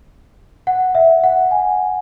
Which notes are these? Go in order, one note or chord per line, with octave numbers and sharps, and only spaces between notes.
F#5
E5
F#5
G#5